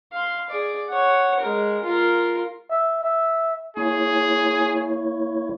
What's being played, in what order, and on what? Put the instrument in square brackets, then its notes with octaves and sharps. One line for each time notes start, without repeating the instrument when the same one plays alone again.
[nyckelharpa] F5 C6
G#4 D5
C#5 F#5
G#3 A#4
F4 A#4
[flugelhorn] E5
E5
[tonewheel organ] A#3 E4 C#5 [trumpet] G#4